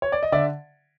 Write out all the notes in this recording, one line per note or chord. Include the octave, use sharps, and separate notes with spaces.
C#5
D5
D#5
D3 D5 E5